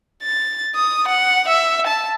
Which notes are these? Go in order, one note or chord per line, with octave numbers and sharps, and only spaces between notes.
A6
D#6
F#5
E5
A5